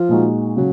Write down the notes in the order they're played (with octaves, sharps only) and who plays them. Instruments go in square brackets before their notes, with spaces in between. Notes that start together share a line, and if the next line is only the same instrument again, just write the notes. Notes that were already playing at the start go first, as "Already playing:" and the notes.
Already playing: [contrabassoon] F3
[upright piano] A#2 G#3 D#4 F#4
[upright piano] C#3 [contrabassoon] F#3